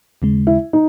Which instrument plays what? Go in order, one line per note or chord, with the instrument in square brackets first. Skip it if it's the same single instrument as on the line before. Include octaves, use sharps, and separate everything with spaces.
[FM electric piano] D#2 C#3 G#3
[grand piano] E4
D#4